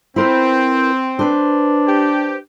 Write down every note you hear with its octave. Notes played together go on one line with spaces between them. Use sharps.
C4 E4 A#4 B4
D4 B4 C5
G4